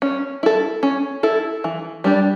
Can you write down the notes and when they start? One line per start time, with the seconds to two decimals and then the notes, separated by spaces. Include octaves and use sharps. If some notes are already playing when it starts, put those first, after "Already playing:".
0.02 C#4
0.43 E4 A4
0.83 C#4
1.23 E4 A4
1.64 E3
2.04 G3 D4 G4